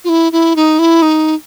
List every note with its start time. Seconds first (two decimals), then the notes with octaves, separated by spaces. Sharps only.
0.05 F4
0.09 E4
0.32 E4
0.56 D#4
0.79 E4
1.02 D#4